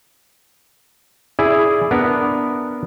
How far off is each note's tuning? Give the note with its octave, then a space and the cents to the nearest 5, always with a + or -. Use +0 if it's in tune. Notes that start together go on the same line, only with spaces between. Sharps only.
E4 +0 G#4 +0 D5 +0
B3 +0 D4 +0 A#4 +0